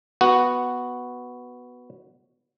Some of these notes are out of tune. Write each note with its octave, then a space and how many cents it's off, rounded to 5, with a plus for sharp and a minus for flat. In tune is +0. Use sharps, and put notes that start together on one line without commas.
B3 +0 F#4 +0